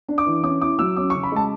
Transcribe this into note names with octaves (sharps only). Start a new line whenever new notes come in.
D4
D6
E3
C#4 D6
E4 D6
F#3 E6
C#4 D6
C#6
C#3
B5
G#3 A5